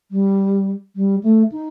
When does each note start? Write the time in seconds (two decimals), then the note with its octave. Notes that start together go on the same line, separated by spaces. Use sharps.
0.11 G3
0.96 G3
1.23 A3
1.52 D#4